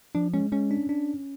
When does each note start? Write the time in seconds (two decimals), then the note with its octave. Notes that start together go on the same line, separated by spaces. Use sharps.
0.15 F3 D4
0.34 G#3 C#4
0.52 G#3 C#4
0.71 D4
0.89 D4